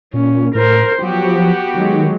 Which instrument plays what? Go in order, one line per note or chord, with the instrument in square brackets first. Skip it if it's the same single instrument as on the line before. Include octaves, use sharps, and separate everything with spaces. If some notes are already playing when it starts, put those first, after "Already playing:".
[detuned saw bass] A#2 [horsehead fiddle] C#4
[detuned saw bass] A2 [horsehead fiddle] A#4 C5
[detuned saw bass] F3 [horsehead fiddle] F#3 [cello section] B3 F#4 G4
[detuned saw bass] D#3 [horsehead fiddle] F#3 G#3